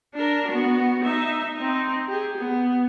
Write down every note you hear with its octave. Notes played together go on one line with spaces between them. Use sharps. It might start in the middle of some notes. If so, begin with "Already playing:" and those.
D4 A#4
B3 F#4
D#4 E5
C4 D#4
G4 G#4
B3